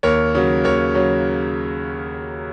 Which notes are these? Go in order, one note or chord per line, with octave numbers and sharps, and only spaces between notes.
D#2 A#4 C#5
C#3 F#3
D#2 A#4 C#5
C#3 F#3